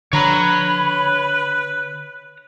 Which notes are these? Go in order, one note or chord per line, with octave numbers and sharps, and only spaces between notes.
D3 B4 C#5 A#5 B5